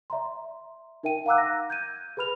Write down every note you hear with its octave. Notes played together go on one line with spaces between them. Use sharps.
D5 E5 A#5 C6
D#4 A#4 E5 G5 D#7
F5 F#5 A#5 D6 E6 F#6
A#6
G6 G#6 D#7
G#4 B4 B5 F6 F7